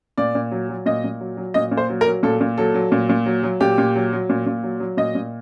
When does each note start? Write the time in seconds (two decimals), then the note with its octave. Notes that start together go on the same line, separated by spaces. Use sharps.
0.18 A#2 D5
0.35 A#2
0.51 F#3
0.69 F#3
0.86 A#2 D#5
1.04 A#2
1.20 F#3
1.37 F#3
1.54 A#2 D#5
1.71 A#2
1.77 C5
1.90 F#3
2.01 A#4
2.07 F#3
2.23 A#2 A4
2.41 A#2
2.58 F#3 A4
2.74 F#3
2.92 A#2
3.09 A#2
3.26 F#3
3.43 F#3
3.61 A#2 G4
3.78 A#2
3.96 F#3
4.13 F#3
4.29 A#2
4.46 A#2
4.63 F#3
4.80 F#3
4.97 A#2 D#5
5.15 A#2